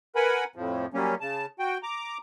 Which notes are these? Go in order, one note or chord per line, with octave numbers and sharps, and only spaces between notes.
A#4 B4 F#5 G#5 B5
F2 A2 F3
F#3 G3 A#3 C#4
C#3 A5
F#4 G5
A#5 D6